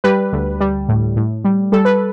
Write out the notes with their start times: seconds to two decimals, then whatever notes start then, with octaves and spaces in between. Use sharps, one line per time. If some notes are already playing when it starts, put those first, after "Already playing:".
0.04 G3 B4
0.32 D2
0.60 G3
0.89 A2
1.16 A2
1.45 G3
1.72 G3 A4
1.85 B4